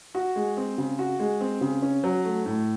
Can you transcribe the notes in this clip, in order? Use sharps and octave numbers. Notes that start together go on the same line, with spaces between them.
F#4
G#3
C4
C#3
F#4
G#3
C4
C#3
C#4
F#3
A3
A2